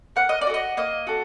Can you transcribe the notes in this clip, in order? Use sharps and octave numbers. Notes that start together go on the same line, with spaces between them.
A#3 F#5
D#5
D5
F#4 A4
D#5
A#3 D#5
F#4 A4